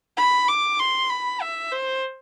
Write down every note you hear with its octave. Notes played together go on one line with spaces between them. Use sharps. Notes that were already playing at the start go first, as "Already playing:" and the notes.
B5
D6
C6
B5
E5
C5